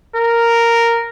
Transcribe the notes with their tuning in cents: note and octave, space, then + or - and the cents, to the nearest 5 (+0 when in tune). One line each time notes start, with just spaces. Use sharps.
A#4 -5